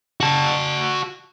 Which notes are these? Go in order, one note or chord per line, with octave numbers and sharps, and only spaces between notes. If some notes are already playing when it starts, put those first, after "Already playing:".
F#4 A5